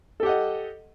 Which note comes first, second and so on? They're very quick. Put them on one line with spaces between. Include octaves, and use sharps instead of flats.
A4 G4 F#5 D#5